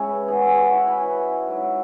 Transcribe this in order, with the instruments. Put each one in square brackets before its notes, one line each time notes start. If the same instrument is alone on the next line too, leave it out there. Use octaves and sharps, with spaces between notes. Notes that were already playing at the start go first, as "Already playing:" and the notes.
Already playing: [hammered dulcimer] C#3 G#3 C#4 E4 C#5 E5
B4
E3 B3 E4 G#4
G#4
F#4
E4
E3 C#4 E4 B4
G#2 F#3 E4